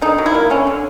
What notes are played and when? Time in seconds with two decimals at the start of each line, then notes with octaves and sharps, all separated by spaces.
0.02 D3 D#4
0.18 F#3
0.26 E4
0.34 A#3
0.50 D3 C#4
0.67 D3